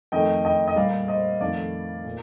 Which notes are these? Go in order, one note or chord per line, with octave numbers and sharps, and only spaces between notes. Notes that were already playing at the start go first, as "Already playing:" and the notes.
F2 D#3 A3 D#5 G5
D#5 G5
D#5
A#2 G3 D5 F5
C5 D#5
F2 D#3 A3 D5 F5
A#2